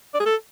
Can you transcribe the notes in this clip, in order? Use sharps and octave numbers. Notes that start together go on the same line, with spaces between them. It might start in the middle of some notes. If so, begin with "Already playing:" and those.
D5
G#4
A4